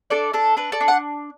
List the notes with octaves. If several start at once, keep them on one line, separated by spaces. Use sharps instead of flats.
D4 A4 D5
D4 A4
D4 B4
A4 D5
D4
F#5